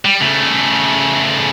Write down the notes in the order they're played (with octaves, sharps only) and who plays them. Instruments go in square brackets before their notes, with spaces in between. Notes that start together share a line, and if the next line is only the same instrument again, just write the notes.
[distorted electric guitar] G3
C#3 A3